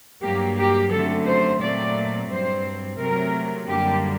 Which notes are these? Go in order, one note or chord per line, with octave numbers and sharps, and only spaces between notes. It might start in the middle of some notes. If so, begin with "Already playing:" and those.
G2 F#3 A#3 G4
G4
F#2 D3 F#3 A3 C4 A4
C5
A#2 F#3 A3 C4 D5
G2 F#3 C4 C5
C3 F#3 A3 C4 A#4
F#2 D3 G3 A#3 G4